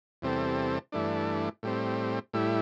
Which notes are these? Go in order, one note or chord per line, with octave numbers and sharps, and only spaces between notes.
E2 C3 G3 C4 A4
G2 E3 A3 D4
A2 G3 C4
A2 G3 E4